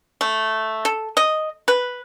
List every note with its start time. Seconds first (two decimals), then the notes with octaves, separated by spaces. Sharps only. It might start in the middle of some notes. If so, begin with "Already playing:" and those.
0.21 A3
0.85 A4
1.17 D#5
1.68 B4